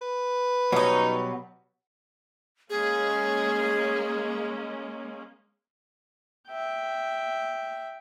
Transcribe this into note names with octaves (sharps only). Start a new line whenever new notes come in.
B4
B2 F#3 G3 C#4 D#4
G#3 A#3 C#4 G#4
E5 G5